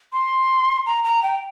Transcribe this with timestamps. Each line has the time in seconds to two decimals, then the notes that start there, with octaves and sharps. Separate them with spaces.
0.13 C6
0.86 A#5
1.04 A#5
1.23 G5